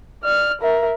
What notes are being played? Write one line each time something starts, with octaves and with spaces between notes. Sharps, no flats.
D5 F6
A#4 E5